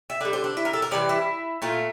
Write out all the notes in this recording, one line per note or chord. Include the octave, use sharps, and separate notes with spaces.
E5
D3 G3 D5
C5
D4
E4
A#4
A4
A#4
C3 E3 G3 D5
E4
A#2 A3 F4